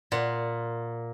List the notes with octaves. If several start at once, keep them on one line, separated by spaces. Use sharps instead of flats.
A#2 F#5